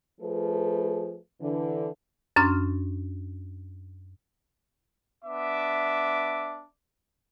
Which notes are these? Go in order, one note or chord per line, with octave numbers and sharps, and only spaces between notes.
F3 A3 G#4 B4
D3 E3
F#2 C#4 D4 C6 F6
B3 D4 E5 D6